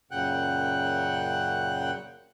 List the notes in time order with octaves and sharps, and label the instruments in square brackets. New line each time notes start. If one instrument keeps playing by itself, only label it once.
[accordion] F#2 A#2 C#3 F#5 G5 F#6